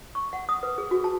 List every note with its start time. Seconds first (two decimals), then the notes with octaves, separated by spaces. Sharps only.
0.15 C#6
0.33 F#5
0.49 D#6
0.63 B4
0.78 G#4
0.91 F#4
1.04 A5